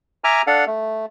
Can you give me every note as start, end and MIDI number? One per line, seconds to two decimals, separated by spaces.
0.24 0.42 76
0.24 0.42 80
0.24 0.42 82
0.24 0.42 86
0.24 0.42 89
0.47 0.65 62
0.47 0.65 69
0.47 0.65 77
0.47 0.65 78
0.67 1.06 57